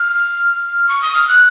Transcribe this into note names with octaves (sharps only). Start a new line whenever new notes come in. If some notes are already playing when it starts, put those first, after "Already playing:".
Already playing: F6
C#6
D#6
F6
F#6